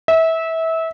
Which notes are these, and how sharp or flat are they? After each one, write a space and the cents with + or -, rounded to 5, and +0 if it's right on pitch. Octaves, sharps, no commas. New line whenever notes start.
E5 -25